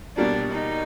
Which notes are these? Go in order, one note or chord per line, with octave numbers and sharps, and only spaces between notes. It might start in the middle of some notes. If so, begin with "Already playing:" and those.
B2 G3 A#3 D4
D#4